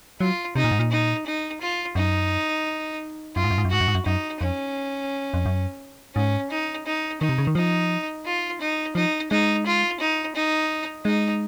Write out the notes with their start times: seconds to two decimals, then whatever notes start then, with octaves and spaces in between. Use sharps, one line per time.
0.21 F#3 F4
0.55 C3 D#4
0.64 A#2
0.71 G#2
0.79 A#2
0.92 D#4
1.26 D#4
1.61 F4
1.95 F#2 D#4
3.36 F#2 F4
3.44 G#2
3.50 F#2
3.58 G#2
3.65 F#2
3.71 G#2 F#4
3.81 F#2
3.88 G#2
3.95 F#2
4.06 F#2 D#4
4.40 F2 C#4
5.34 F2
5.46 F#2
6.15 G#2 C#4
6.50 D#4
6.86 D#4
7.21 D#3 D#4
7.29 C3
7.38 C#3
7.47 D#3
7.55 F3 D#4
8.25 F4
8.61 D#4
8.95 F3 D#4
9.31 G#3 D#4
9.66 F4
10.00 D#4
10.35 D#4
11.05 G#3 D#4